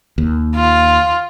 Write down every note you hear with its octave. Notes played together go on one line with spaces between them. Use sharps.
D#2
F4